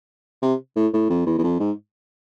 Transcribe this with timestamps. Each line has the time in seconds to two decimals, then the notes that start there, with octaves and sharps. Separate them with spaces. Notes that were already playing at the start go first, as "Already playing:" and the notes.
0.42 C3
0.76 A2
0.93 A2
1.10 F2
1.26 E2
1.38 E2
1.44 F2
1.59 G#2